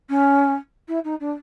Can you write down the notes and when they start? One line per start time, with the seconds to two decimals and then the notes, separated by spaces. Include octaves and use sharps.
0.09 C#4
0.88 E4
1.04 D#4
1.20 D4